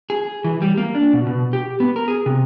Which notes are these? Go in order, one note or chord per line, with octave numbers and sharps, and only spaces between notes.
G#4
E3
G3
A#3
D4
B2
B2
G4
B3
A#4
G#4
C3